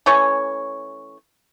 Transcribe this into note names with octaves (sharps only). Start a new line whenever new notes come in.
E3 A3 C#4 C#5